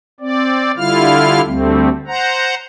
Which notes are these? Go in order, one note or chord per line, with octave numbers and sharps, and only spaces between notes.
C4 D5
D3 G3 E4 F4 F5 F6
D2 G3 A3 C4
C5 F#5 A#5